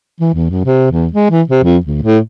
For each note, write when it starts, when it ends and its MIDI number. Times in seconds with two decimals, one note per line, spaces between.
0.21 0.32 52
0.35 0.48 40
0.50 0.62 42
0.65 0.88 48
0.92 1.07 40
1.13 1.28 56
1.31 1.42 52
1.50 1.63 48
1.64 1.78 41
1.86 2.02 38
2.03 2.19 45